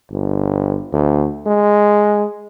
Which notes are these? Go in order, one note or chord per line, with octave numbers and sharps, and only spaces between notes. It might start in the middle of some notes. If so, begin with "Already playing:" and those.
G1
D2
G#3